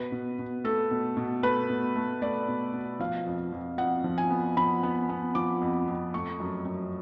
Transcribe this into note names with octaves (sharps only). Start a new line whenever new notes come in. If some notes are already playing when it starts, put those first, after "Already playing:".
Already playing: B2 B4
B2
B2
A3 A4
B2
B2
A3 B4
B2
A3
A3 D5
B2
B2
F3 F5
F2
F2
F2 F#5
F3
G#5
B3
F3 B5
B3
B3
F3 D6
F2
F2
A3 C#6
F#2
F#2